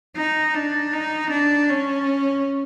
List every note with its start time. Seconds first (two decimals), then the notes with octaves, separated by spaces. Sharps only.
0.16 D#4
0.55 D4
0.93 D#4
1.31 D4
1.70 C#4